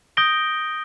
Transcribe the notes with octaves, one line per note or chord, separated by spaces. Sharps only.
D#6 G6 A#6 D7 G7